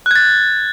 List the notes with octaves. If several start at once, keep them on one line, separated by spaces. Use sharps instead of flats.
F#6 G#6 A6